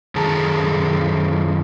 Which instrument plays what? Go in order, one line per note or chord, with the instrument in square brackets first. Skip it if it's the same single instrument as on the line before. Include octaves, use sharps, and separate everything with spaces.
[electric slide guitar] F#2 D#3 G#4 A4 A5 A#5